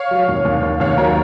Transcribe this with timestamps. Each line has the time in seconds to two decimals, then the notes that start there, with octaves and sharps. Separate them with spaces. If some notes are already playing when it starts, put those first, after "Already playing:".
Already playing: C#5 F5
0.11 F#3
0.28 D#2
0.45 D#2
0.63 D#2
0.80 D#2 C#5 F5
0.98 F#3 A#4 C#5